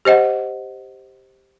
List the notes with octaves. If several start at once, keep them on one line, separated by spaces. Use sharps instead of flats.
G4 C5 D#5 F#5